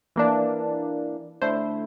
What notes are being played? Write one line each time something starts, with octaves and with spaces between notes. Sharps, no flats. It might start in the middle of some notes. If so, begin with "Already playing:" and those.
E3 A#3 D4
D3 A3 E4 C5